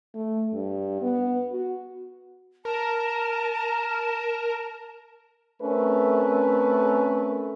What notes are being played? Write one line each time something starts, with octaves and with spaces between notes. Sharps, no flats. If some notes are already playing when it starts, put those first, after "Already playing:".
A3
G2
B3
F#4
A#4 A5
A3 C4 C#4 A#4 B4